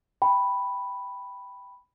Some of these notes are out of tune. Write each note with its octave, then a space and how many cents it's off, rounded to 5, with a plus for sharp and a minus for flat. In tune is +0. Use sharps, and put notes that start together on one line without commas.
G5 +5 B5 +0